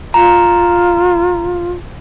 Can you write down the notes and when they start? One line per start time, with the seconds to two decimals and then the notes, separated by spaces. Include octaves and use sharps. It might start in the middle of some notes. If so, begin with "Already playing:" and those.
0.14 F4 A#5